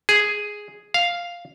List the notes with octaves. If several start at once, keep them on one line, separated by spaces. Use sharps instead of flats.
G#4
F5